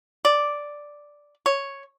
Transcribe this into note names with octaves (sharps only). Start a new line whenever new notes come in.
D5
C#5